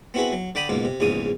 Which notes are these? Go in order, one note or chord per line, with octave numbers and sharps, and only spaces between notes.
B3 C4 E4 F#4 G#4 B4
F#3
D3 D5 G5 B5 D#6
C#2 G#2 B2 A#3
C3
A#1 E2 G#2 C#3 D#6